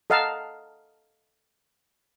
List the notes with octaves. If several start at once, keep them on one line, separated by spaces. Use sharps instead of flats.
A4 D#5 F5 F#5 A5 A#5